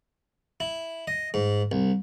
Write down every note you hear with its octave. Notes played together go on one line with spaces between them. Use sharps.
E4
D#5
G#2
C2